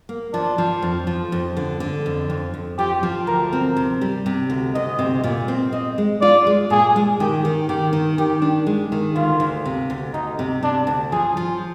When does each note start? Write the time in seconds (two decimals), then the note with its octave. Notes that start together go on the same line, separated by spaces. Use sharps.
0.09 A#3
0.33 F3 D4
0.58 F3
0.82 F2
1.07 F3
1.32 F2
1.57 D3
1.80 D3
2.06 F2
2.30 F2
2.54 F2
2.78 F3 G4
3.03 F3
3.27 D2 A#4
3.53 C4
3.77 C3
4.01 G3
4.26 C3
4.50 D2
4.74 D2 D#5
4.99 C3
5.24 A#2
5.48 C4
5.73 C4 D#5
5.98 G#3
6.21 F4 D5
6.47 G#3
6.70 A#2 G#4
6.96 G#3
7.20 D#3 G4
7.45 D#3
7.68 D#3 G4
7.93 D#3
8.18 D#3 G4
8.42 D4
8.67 G#3
8.92 D#3
9.16 D2 F4
9.40 D2
9.65 C3
9.90 D2
10.13 D2 D#4
10.39 C3
10.63 C3 D4
10.87 D2
11.12 F3 G#4
11.37 F3